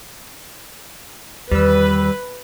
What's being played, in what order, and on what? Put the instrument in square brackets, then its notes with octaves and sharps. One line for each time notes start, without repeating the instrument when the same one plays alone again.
[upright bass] E2 D#3 [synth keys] G3 E6 [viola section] B4